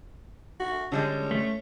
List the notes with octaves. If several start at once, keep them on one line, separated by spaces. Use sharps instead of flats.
F#4
D3 G3 G#3 C#4
A3